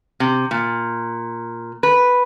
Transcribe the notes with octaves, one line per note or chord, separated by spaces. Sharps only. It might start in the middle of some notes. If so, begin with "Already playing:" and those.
C3
A#2
B4